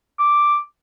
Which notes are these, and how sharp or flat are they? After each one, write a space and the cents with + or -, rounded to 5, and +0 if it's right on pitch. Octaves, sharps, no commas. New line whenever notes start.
D6 +0